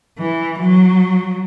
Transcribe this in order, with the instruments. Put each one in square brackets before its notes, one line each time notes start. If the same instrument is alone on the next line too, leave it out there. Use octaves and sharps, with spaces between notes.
[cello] E3
F#3